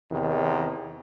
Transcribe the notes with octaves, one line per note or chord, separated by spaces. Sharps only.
E2 C3 D#3